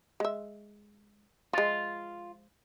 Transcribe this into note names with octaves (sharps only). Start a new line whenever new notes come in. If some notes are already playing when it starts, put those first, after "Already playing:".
G#3 E5
F3 G#3 F4